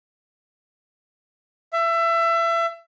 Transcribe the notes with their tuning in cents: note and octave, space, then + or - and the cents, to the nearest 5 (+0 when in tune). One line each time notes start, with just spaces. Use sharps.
E5 +25